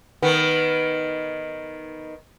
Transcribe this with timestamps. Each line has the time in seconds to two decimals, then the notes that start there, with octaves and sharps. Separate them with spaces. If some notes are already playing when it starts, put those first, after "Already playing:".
0.22 D#3 B3